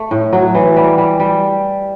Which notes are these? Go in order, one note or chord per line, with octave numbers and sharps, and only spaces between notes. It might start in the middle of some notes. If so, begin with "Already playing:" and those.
Already playing: A3
A2
F#3
E3
G3
G3
G3